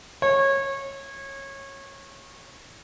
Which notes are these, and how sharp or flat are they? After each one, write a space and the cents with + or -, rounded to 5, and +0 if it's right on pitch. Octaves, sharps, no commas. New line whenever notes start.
C#5 -20